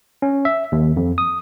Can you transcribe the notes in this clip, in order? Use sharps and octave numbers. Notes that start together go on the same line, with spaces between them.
C#4
E5
D#2
F2
D#6